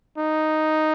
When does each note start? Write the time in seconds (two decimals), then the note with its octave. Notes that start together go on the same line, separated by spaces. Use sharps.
0.18 D#4